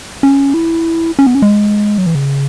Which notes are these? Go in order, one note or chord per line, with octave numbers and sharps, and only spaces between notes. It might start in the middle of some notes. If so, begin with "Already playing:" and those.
C#4
E4
C#4
B3
C#4
G#3
F#3
E3
C#3